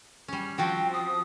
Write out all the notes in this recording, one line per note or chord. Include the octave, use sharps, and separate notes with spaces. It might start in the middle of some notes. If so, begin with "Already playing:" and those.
G3 C#4
F3 C4 F#4 G5
D#6